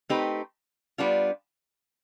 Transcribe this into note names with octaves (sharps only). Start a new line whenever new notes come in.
A3 C4 D#4 G4 B4
G3 B3 D4 F4